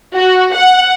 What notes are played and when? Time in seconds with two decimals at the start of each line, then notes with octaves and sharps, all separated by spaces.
0.16 F#4
0.54 F#5